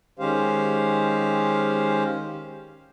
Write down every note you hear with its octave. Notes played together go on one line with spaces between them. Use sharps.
D#3 G#3 C#4 G4 C5 F5